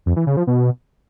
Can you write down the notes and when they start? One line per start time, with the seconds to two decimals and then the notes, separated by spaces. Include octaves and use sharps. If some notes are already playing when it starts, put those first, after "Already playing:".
0.06 F2
0.16 E3
0.27 C#3
0.37 F3
0.47 B2